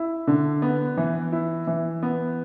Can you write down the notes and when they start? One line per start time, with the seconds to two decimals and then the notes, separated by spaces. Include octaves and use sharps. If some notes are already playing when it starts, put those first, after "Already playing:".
Already playing: E4
0.27 D3
0.62 B3
0.97 E3
1.32 E4
1.67 E3
2.03 B3